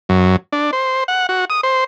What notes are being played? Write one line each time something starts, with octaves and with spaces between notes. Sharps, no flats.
F#2
D4
C5
F#5
F#4
D#6
C5